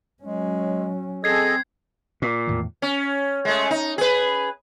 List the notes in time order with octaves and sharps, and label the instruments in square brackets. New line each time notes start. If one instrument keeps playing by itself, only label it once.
[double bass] F#3 C#4 [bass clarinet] G#3
[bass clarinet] C4 [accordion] G#4 A4 D#5 [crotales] G#6 C7
[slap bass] A#2
[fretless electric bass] E2 A2 D#3
[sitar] C#4
G#3 A3
D#4
G#4 B4